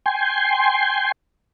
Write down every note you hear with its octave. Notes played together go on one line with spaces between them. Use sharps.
G5 G#5 C6